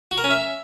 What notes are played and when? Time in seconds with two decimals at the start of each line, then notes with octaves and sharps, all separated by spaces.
0.11 F#4
0.18 A#4
0.24 C#4
0.30 E5